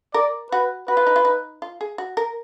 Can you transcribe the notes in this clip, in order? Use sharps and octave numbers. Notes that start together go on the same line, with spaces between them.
A#4 D5
F#4 B4
F#4 B4
F4
D#4
F4
D#4
F4
G#4
F#4
A#4